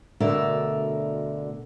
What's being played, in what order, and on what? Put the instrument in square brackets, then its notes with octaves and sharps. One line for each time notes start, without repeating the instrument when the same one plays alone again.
[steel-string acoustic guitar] D2 B2 D3 A#4 D5 E5